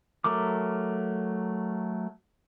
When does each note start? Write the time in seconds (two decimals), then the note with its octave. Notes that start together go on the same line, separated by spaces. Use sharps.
0.24 F#3 A3 A#4 D6